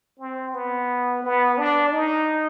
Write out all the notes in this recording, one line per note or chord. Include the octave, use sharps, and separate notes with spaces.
C4
B3
B3
D4
D#4